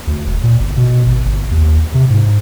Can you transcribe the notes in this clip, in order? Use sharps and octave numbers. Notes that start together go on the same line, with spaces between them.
D2
E1
A#2
G1
B2
G#1
G1
D#2
C3
G#2